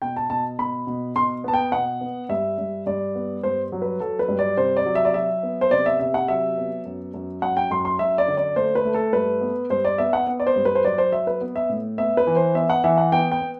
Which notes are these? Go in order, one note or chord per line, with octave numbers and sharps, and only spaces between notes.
B2 G5
A5
B2 A5
B2 B5
B2
B2 C6
B3 A5
G5
B2 F#5
B3
G2 E5
G2
G2 D5
B3
G2 C5
F#3
B4
F#3 A4
B4
G2
D5
C3 C5
D5
F#3
E5
D5
F#3 E5
B3
C5
C3 D5
E5
C3 E5
F#5
F#3 E5
B3
F#2
F#2
F#2 F#5
G5
F#2 C6
C6
F#2 E5
D5
D3
D5
A3 C5
B4
A3
A4
G2 B4
B3
G2 C5
D5
B3 E5
F#5
B3
D5
C5
G2
B4
C5
F#3 D5
C5
F#3 E5
B4
B3
E5
A2
B3 E5
B4
E3
C5
B3 E5
F#5
E3 E5
F#5
B3 G5
G5
B3